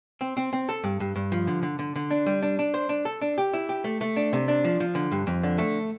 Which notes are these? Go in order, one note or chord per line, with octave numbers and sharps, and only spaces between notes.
C4
C4
C4
A4
G2
G2
G2
F3
D3
D3
D3
D3
D4
G3
D4
D4
C5
D4
A4
D4
G4
E4
G4
A3
A3
D4
C3
D4
F3
F3
D3
G2
F2
D3
A3